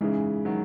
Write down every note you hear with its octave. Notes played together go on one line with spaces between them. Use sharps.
C#3 E3 G#3 D#4 G#4
D#3 F#3